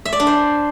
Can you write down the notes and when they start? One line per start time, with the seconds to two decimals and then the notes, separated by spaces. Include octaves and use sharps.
0.05 E5
0.13 D5
0.20 D4
0.27 C5